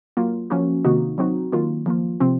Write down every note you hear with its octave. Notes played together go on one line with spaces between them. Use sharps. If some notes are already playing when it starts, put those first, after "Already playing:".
F#3 A#3 F4
F3 A#3 C#4 F#4
C3 D#3 A#3 D#4 F#4
F#3 C4 D#4 F#4
D#3 F#3 A#3 F4
F3 A#3 F4
C3 F3 C4